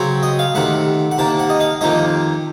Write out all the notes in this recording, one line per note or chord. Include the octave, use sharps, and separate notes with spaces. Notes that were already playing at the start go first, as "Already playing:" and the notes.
Already playing: C#3 F#3 C4 F#5
D#5
F5
C3 D#3 A3 F#5
F#5
C3 D#3 A#3 A5
F#5
D#5
F5
F2 C3 D#3 A#3 D#5